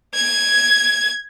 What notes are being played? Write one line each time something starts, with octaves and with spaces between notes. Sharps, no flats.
G#6